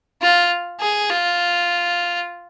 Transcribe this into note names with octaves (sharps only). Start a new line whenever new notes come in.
F4
G#4
F4